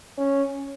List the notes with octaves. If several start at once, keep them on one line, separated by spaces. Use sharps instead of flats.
C#4